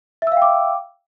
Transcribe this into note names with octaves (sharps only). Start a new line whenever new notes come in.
E5 F5 G5 D6 E6